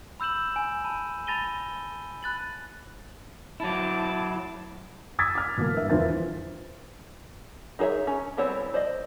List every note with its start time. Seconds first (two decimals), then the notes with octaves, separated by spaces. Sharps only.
0.20 B5 E6 G6 E7 F#7
0.56 G#5
0.84 A5 B5
1.27 A5 B5 A6 A#6 D#7 G7
2.23 B5 F#6 A6 F#7
3.60 F#3 E4 A5 D6
5.19 D#6 E6 G#6 A6 B6
5.35 D6 F6
5.57 B2 E3 F#3 A#3
5.74 G2 E5
5.90 E2 F3 C5 A6
7.79 D#4 G#4 C5 C#5 E5
8.07 C#4
8.37 G3 B3 C4 E4 C#5
8.74 C5 D5 D#5